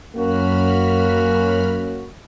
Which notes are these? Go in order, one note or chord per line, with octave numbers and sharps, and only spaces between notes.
F#2 A#3 C#4 F#4 B5 F6